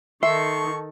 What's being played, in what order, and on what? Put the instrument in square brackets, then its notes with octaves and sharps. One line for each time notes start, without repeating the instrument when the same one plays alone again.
[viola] D#3 A4 [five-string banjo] E5 [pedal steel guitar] C6 [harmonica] C#6